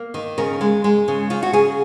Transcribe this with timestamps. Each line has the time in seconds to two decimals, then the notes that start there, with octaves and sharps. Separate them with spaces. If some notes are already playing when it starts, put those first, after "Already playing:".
Already playing: A#3
0.14 D#3
0.38 C#3 A#4
0.61 G#3
0.84 G#3
1.08 C#3
1.30 C#3 F4
1.43 F#4
1.53 C#3 G#4